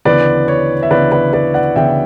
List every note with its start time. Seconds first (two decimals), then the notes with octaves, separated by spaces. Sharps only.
0.05 D2 C#3 E3 B3 B4 D5
0.48 C#5
0.83 E5
0.90 D2 C#3 E3 B3 B4 D5
1.12 B4 D5
1.33 B4 D5
1.54 D5 F#5
1.76 D2 C#3 E3 B3 E5 G5